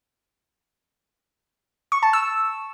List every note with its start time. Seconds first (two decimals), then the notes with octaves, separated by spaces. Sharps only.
1.92 C#6
2.03 A5
2.13 E6